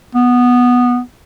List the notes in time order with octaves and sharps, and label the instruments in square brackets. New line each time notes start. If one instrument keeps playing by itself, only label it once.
[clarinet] B3